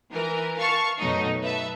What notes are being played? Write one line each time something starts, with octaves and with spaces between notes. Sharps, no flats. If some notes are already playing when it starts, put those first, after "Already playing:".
E3 A#4
F5 A5 C#6
F#2 B2 F#3 A3 D#4
B4 E5 A5